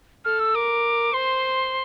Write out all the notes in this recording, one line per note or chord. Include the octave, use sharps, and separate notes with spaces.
A4 F6
E6
A#4 D6
C5 C6